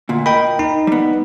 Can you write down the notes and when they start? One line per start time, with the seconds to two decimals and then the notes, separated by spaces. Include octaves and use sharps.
0.09 D2 A#2
0.26 A#4 D#5 G5 B5
0.59 D#4
0.87 G3 B3